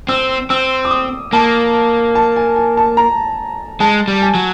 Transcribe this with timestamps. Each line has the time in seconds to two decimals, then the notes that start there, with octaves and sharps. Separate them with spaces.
0.09 C4 E6
0.50 C4 E6
0.85 D6
0.91 D#6
1.33 A#3 A5
2.15 A5
2.36 G#5
2.56 G#5
2.77 A5
2.97 A#5
3.80 G#3 A5
4.08 G3
4.22 G#5
4.35 F#3